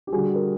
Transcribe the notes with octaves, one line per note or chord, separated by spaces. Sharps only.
G4
D3 G3 F#4 G#4
A#4